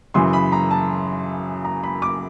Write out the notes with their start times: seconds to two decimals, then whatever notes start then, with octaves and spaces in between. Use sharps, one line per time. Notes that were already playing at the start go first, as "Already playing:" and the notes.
0.14 F#2 C#3 E3 C6
0.33 B5
0.52 A#5
0.71 A5
1.65 A#5
1.83 B5
2.02 D6